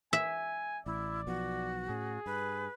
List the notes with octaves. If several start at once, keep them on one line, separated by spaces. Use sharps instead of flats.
E5 G#5
A1 E4 D5
B1 F3 B3 F#4
A2 C#4 G#4
G2 B4